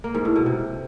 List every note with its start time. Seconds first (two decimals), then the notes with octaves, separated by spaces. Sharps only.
0.04 A#3
0.15 G#2
0.25 A2
0.36 B2
0.46 C3